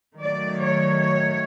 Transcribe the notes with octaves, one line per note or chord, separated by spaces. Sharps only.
D#3 F#3 A3 D5
C#5
C#5